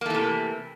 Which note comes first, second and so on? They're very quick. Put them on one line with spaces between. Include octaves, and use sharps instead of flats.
A#3 A3 E3 C3